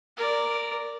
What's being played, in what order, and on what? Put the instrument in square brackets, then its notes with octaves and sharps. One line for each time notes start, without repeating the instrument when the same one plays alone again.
[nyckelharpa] A#4 D5